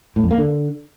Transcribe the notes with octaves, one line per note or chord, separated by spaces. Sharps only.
A2
F2
A#3
D3